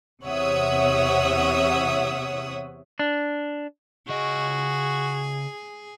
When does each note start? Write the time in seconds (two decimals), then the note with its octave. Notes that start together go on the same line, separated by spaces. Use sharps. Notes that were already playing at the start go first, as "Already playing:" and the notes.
0.24 E2 C3 C#5 E5 F#5 D#6
2.99 D4
4.09 C#3 F#4 G#4 D#5